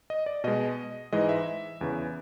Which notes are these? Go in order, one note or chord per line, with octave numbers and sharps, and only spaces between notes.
D#5
D5
B2 G#3 D#5
G#2 E3 G#3 D#5
E5
E2 C#3 E3